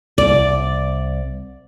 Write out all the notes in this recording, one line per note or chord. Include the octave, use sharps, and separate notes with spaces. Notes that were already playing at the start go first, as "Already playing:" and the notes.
C2 D5